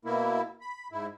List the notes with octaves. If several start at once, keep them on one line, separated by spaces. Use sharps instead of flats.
B2 A#3 E4
B5
G#2 E4